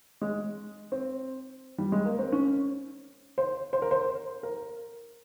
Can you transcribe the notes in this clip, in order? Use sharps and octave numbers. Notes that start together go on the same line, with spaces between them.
G#3
C4
G3
G#3
A#3
C4
C#4
C5
C5
A#4
C5
A#4